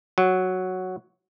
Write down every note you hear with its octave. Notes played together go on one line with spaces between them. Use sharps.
F#3